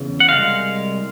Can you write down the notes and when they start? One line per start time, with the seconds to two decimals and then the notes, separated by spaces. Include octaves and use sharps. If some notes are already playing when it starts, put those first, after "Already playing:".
Already playing: E2 C#3
0.20 F#5
0.28 C2 B2 G#3 F5